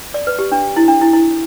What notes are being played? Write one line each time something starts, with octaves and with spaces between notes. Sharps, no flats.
D5
B4
G4
D4
E4
D4
E4
E4